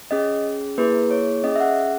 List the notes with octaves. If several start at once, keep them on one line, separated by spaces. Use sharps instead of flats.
C#4 G#4 D#5
A#3 E4 G#4 B4
C#5
C#4 G#4 D#5
E5
F#5